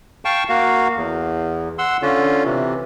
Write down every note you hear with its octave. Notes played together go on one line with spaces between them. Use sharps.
F5 G5 A5 C#6
A#3 F#4 F5
E2
F#5 C6 E6
D3 C#4 F4
C3 E3